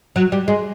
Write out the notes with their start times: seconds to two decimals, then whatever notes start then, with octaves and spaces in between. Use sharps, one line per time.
0.16 F#3
0.32 G3
0.48 G#3